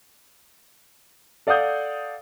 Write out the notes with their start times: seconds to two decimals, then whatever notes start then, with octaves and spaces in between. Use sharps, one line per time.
1.47 A4 D5 F5 F#5 D#6 G6